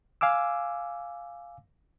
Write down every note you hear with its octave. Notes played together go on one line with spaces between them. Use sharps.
F5 G#5 D6 E6